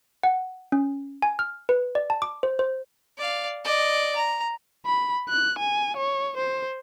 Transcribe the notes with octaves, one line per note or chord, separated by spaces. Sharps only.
F#5
C#4
G#5
F6
B4
D5
A5
D6
C5
C5
D5 F5
D5 D#5
A#5
B5
F#6
G#5
C#5
C5